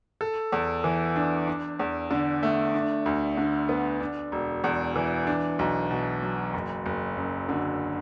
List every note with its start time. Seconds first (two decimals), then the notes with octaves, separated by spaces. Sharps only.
0.21 A4
0.52 E2
0.84 E3
1.16 D4
1.47 D4
1.79 E2
2.11 D3
2.43 A3
2.74 D4
3.06 D2
3.37 D3
3.69 B3
4.00 D4
4.32 E1
4.64 E2
4.96 E3
5.27 D4
5.59 B1
5.91 B2
6.22 F#3
6.54 F#1
6.86 F#1
7.17 F#2
7.49 D3